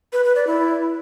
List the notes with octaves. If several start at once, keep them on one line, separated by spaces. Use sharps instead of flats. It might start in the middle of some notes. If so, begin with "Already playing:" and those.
B4
B4
D5
E4